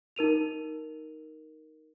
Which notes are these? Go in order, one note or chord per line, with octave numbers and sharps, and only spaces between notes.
D#4 A#4 D#7 F7